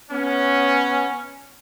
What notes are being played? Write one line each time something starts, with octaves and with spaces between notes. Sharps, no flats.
B3 C#4